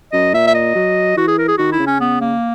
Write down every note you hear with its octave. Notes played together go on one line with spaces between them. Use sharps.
F#2 D#5
A#2 E5
E5
D#5
F#3
E3 F#4
G#4
A#4
G#4
D#3 F#4
E4
C#3
C#4
B3
A#3